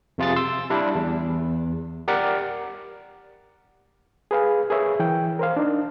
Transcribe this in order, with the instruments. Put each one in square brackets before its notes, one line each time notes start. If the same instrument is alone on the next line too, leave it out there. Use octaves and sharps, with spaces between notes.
[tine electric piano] F2 C3 F4 G#4 A6
C6 E6
G3 D4 E4
E2
G4 A#4 D5 F#5
[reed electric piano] G#4 B4 F5 G#5
G#4 A#4 B4 C#5 E5
E3 G5
A#4 C5 F5
D4 D#4